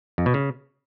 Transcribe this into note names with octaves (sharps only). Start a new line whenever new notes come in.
F2
B2
C#3